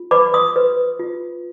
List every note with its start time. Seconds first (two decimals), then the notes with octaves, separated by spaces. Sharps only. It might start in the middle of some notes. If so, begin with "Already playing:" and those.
Already playing: F4
0.11 B4 B5 D6
0.34 C6 D#6
0.56 B4
0.99 F4